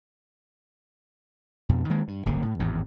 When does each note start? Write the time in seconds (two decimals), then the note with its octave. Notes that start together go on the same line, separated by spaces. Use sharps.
1.69 F2 B2
1.90 D#3 G#3 A#3
2.08 G2
2.25 D1 G1 C#3 A#3
2.42 A2
2.60 G#1 E2 A2